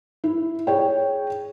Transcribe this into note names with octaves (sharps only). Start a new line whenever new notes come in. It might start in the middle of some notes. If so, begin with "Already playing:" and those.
E4
G#4 C#5 G5